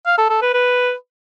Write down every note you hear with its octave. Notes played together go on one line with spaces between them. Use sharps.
F5
A4
A4
B4
B4